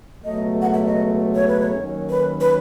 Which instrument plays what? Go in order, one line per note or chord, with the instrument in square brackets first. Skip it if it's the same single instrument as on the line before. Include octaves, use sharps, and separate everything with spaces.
[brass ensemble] C#2 B2 F#3 A3 [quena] D#5
[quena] F#5
E5
D#5
C#5
B4
C#5
[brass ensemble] D#2 D#3 F#3 C#4
[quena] B4
B4